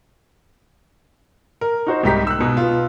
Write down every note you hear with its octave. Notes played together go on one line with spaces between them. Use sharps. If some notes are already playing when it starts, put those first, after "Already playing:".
A#4
D#4 F#4 C5
C2 G#2 D#4 G4 B6
E6 F#6
G#2 B2
B3 F4